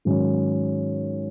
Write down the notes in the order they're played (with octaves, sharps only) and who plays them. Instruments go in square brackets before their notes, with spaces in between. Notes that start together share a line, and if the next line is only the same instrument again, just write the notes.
[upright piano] G#2 D#3 F#3 C#4